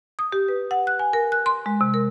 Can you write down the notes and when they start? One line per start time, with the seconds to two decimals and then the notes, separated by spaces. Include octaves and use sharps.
0.19 D#6
0.32 G4
0.48 B4
0.71 F#5
0.87 F#6
0.99 G#5
1.13 A#4
1.32 F#6
1.46 C6
1.66 G#3
1.81 C3
1.94 A#4